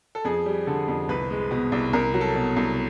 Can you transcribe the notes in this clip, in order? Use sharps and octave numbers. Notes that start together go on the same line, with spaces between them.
A4
F2 G#4
G3
D3 A4
F2
C2 B4
G#3
B2
C2
C2 A#4
F#3
A4
B2
C2